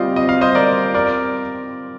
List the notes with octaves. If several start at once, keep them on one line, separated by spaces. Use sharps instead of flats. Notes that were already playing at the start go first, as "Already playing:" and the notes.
Already playing: G3 C4 F4 D5 D#5 F5
D#5
F5
C5 D#5
A#4 D5
A#4 D5